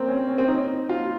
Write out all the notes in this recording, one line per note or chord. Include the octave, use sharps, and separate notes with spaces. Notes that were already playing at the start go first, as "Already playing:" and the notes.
Already playing: A#3 C4
C#4
C#4
C4
D#4
F4